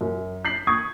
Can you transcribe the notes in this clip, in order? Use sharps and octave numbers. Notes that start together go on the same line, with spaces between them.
F#2
G6 B6 C7 F#7
C#6 D#6 G#6